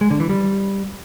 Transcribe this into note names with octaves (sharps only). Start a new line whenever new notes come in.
G#3
D3
E3
G3